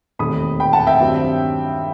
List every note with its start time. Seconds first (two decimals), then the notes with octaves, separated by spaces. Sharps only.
0.19 E1 D#2 D#3 A3 C4 B5 D#6
0.60 G5 B5
0.73 F#5 A5
0.87 E5 G5
1.00 G2 D#3 F#3 C4